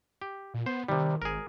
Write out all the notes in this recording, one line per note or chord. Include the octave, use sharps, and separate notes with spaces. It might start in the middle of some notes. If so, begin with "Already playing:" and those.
G4
A#2
B3 C5
C3 D#3 G3
G#1 G#4 A#4